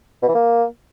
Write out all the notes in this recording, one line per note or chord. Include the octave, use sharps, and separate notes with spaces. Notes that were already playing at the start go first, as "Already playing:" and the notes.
B2
E3
A#3